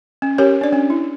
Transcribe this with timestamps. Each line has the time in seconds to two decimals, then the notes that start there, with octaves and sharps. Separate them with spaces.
0.22 C#4
0.38 C#4 G4 A#4 C#5
0.61 D4 D5
0.73 C#4
0.90 E4